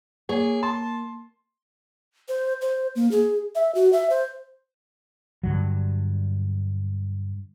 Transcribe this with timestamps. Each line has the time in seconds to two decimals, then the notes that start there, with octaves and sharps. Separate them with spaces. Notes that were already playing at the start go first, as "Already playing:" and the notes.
0.29 A#3 G#4 C#5
0.63 A5 C6
2.28 C5
2.61 C5
2.95 A#3
3.11 G#4
3.55 E5
3.75 F#4
3.93 E5
4.10 C5
5.43 G2 D3 F#3